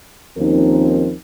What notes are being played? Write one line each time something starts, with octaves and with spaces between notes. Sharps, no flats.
D#2 F3 C4 C#4 D#4 A#4